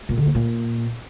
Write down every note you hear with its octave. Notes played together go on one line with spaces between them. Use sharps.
A#2
D3
A#3
A#2